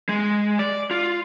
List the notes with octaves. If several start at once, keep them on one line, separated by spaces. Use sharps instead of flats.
G#3
D5
F4